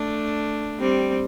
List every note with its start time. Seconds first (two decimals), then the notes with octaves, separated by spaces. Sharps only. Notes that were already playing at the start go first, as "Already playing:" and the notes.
Already playing: A3 D4
0.80 G3 C4